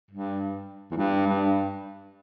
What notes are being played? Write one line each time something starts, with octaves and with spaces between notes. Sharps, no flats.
G2
E2
G2
G2